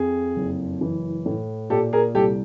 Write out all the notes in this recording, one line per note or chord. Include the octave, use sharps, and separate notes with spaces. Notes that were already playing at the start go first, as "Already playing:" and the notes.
Already playing: F2 G#4
F#1
E3
A2
A#2 G4 A4
G#4 A#4
C2 G4 A4